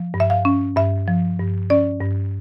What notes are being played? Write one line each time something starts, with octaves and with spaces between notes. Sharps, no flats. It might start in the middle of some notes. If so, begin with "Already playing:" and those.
Already playing: F3
G2
E5
F5
C#4
G2 E5
F3
G2
C#4 D5
G2